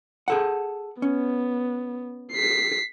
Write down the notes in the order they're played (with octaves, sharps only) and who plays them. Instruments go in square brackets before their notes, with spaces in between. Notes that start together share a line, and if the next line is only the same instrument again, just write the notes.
[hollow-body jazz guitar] G#4 A4 F#5
[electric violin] B3 [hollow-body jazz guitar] C#4
[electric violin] B6 C7